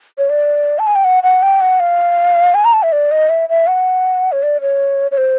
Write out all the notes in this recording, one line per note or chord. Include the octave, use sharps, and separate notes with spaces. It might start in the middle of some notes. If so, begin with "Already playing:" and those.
C#5
D5
A5
G#5
G5
F#5
F#5
G5
F#5
F5
G#5
A#5
A5
E5
D5
D#5
E5
E5
F#5
C#5
D5
C#5
C#5
C5